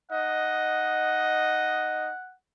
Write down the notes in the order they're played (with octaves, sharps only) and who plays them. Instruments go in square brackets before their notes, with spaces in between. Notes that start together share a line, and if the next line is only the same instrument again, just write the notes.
[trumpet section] D#4 D#5 [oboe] F#5